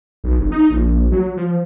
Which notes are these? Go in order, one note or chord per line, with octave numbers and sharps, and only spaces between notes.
B1
F1
D#4
A#1
A#1
F#3
F3